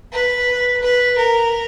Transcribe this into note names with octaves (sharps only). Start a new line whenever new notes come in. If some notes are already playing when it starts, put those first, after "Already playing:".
B4
B4
A#4